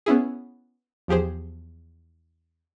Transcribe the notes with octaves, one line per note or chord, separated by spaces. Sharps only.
B3 C#4 E4 G#4
E2 F3 G4 G#4 C5